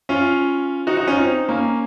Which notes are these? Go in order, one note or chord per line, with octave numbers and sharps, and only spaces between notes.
C#4 F4
D#4 F#4
D#4 F#4
C#4 F4
C4 D#4
A#3 C#4